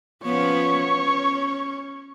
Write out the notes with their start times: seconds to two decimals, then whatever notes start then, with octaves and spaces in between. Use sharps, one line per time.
0.24 F3 B3 C#4 C#5
0.91 C#4